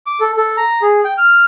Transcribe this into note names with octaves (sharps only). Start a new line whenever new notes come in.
D6
A4
A4
A#5
G#4
G5
F6